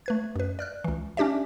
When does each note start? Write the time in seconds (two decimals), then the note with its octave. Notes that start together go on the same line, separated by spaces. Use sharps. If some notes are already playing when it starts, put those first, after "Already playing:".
0.06 A3 B4 G#6
0.36 F#2 B4
0.59 D5 F6 F#6
0.84 C#2 E3
1.17 C#4 D4 G4 D5 E5